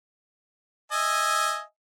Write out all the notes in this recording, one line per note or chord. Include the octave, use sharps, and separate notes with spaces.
D#5 E5 G#5